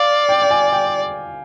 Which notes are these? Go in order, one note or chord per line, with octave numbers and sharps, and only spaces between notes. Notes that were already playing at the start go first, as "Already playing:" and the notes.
Already playing: D5 F5
G5
G5
G#5
G5